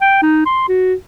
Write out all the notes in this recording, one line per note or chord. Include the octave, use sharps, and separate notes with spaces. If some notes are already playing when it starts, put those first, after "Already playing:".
G5
D#4
C6
F#4